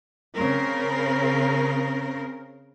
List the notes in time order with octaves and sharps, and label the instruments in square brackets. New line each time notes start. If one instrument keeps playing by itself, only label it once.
[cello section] C#3 C4 A#4